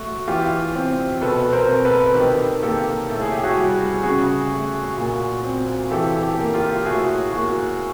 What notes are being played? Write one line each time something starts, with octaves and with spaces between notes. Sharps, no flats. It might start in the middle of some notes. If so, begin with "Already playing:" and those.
Already playing: A3 F#4
E3 F4 G4
C4
B2 A4 B4
A#4 C5
C4
A4 B4
D#3 G4 A4
A#3 G4 A4
A2 A4
G#4
G4
F#4 G#4
G3
C#3 F#4 G#4
A3
A#2
C4
E3 G4 A4
G4 A4
A#3
F4 G4
A2 F#4 G#4
A#3 F#4